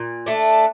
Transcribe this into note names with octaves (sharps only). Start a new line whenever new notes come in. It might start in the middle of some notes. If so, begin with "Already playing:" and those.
Already playing: A#2
A3 D4